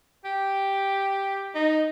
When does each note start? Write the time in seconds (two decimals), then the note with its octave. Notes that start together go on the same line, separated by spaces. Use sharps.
0.25 G4
1.55 D#4